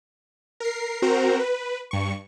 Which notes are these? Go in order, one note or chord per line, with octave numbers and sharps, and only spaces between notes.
A#4 C7
C4 F#4 A#4 C5 A#5
B4
G2 C#6